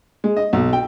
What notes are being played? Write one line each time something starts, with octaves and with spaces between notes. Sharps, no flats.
G#3
D#5
B1
G5